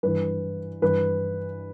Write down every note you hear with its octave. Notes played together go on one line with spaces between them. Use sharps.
G2 E3 B4
G2 E3 B4